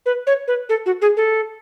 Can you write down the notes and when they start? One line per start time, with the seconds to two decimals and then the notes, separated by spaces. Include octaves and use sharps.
0.06 B4
0.27 C#5
0.48 B4
0.69 A4
0.86 F#4
1.02 G#4
1.17 A4